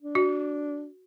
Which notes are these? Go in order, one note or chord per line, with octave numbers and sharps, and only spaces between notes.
D4
F#4